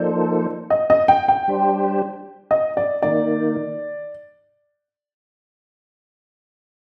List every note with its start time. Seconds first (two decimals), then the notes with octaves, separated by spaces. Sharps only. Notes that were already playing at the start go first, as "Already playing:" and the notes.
Already playing: F3 A#3 D#4 A4 C5 D5
0.70 D#5
0.90 D#5
1.08 G5
1.28 G5
1.48 G3 D4 G4 C5
2.51 D#5
2.77 D5
3.02 D#3 A#3 D#4 D5